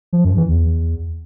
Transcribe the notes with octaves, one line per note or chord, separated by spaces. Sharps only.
F3
F#2
E3
E2